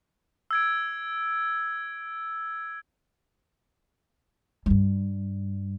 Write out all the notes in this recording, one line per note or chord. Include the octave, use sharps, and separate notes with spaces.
E6 G#6 D7
G2 G3